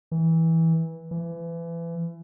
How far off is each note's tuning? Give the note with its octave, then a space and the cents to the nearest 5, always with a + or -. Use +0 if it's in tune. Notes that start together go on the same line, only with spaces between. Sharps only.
E3 -15
E3 +30